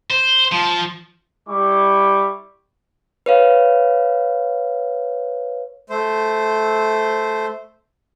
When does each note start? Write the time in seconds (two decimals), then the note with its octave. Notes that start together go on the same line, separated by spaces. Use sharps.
0.11 C5
0.52 F3
1.48 G3 E4 C#6 D6
3.26 B4 C#5 F5
5.90 A3 C5